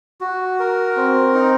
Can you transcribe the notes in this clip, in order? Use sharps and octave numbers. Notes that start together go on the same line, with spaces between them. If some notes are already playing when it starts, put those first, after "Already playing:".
F#4
A#4
C4
D#4